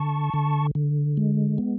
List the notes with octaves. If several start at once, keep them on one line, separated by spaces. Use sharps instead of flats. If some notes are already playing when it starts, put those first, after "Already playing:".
Already playing: D3 A5 C#6
D3
D3
G#3
B3